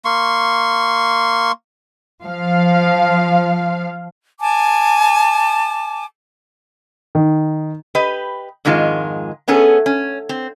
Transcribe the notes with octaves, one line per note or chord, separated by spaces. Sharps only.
A#3 C6 C#6
F3 F5
G#5 A5 D6
D#3
G4 B4 D#5
F2 G#2 D#3 G#3 F4
A3 B3 C#4 G#4 A4
C#4
C4